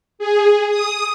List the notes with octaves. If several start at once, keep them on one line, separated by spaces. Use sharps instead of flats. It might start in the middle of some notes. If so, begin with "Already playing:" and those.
G#4
D#6